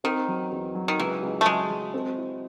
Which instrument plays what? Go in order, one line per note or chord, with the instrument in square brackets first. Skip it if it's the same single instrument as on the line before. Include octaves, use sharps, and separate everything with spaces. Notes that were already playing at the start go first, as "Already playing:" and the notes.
[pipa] D#3 [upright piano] C4
[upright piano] F#3
E2
F#3
[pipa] D#3
[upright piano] C#2 [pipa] E3
[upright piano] C#2
[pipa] A3
[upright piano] F#3 [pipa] G#3
[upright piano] F#3
C4
E4